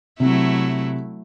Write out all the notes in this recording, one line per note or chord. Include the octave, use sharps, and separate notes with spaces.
C3 F#3 A3 E4